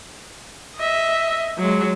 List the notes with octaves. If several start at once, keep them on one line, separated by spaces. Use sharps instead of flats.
D#5 E5
F#3 G#3